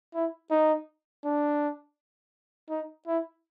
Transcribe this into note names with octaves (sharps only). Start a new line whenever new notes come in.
E4
D#4
D4
D#4
E4